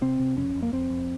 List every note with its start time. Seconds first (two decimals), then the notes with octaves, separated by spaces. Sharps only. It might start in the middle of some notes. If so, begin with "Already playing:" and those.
0.01 C3 C4
0.20 C3
0.37 F2 C#4
0.55 F2
0.62 A#3
0.73 F2 C4
0.90 F2